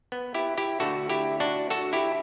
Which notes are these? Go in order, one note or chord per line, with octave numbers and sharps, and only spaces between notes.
B3
E4 G4
E4 G4
D2 D3 A3 F#4 A4
E4 G4
D4 F#4
F#4 A4
E4 G4